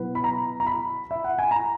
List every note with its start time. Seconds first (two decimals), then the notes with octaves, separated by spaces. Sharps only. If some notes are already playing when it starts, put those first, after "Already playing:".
Already playing: B2 F#3 B3 E4 B4
0.15 B5
0.24 A#5
0.60 A#5
0.67 B5
1.11 E5
1.24 F#5
1.39 G#5
1.51 A#5